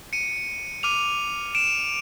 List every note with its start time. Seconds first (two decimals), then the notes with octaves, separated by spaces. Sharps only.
0.13 C#7 D#7
0.83 D6 F6 D#7 F7
1.55 D7 E7